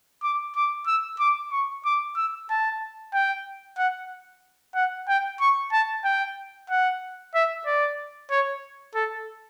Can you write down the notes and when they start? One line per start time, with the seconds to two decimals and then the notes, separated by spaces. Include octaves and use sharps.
0.23 D6
0.56 D6
0.87 E6
1.20 D6
1.52 C#6
1.85 D6
2.17 E6
2.50 A5
3.14 G5
3.78 F#5
4.75 F#5
5.08 G5
5.41 C#6
5.72 A5
6.05 G5
6.70 F#5
7.35 E5
7.66 D5
8.31 C#5
8.95 A4